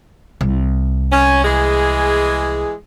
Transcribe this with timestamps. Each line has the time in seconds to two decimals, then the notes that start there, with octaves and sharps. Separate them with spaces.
0.41 C2
1.11 C#4
1.44 E3 G#3 G#4